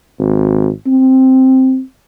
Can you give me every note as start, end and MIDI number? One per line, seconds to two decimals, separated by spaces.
0.19 0.69 32
0.86 1.80 60